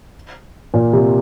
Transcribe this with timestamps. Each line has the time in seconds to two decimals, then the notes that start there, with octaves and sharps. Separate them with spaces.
0.74 A#2
0.93 C3